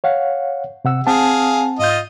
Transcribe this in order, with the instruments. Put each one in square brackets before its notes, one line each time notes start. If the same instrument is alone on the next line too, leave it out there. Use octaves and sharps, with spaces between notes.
[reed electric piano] C#5 F5 F#5
C3 F#5 E6
[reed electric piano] C4 F#5 A5 [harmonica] G#4 F5
[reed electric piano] G#2 G6 [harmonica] F4 D#5